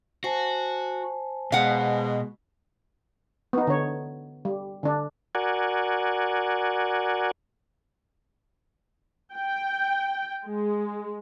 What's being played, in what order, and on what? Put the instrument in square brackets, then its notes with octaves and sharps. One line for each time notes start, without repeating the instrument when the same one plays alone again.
[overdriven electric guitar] F#4 [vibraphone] C5 G#5 A5
[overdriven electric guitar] B2 [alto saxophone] G#3 [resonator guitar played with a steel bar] F5 F#5
[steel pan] B3 D#4
D3 C#5
G3
D3 D4
[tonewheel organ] F#4 A#4 D5 F#5 G#5
[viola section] G5
G#3